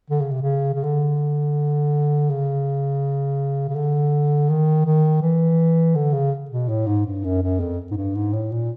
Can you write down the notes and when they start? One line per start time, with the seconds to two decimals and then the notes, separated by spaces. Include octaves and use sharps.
0.10 D3
0.21 C#3
0.31 C3
0.42 C#3
0.74 C#3
0.84 D3
2.30 C#3
3.69 C#3
3.76 D3
4.49 D#3
4.86 D#3
5.22 E3
5.95 D3
6.13 C#3
6.50 B2
6.69 A2
6.87 G#2
7.06 G2
7.24 F#2
7.42 F#2
7.60 F2
7.91 G#2
7.97 G2
8.15 G#2
8.33 A2
8.52 A#2